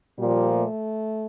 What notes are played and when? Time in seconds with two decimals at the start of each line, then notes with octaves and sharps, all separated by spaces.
0.18 A#2 F3 G3
0.50 A3